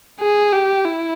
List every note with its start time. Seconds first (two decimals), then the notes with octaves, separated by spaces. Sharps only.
0.20 G#4
0.53 G4
0.85 E4